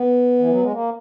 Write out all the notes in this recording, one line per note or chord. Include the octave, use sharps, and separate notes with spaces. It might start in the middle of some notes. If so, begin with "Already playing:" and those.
Already playing: B3
E3
F#3
G#3
A#3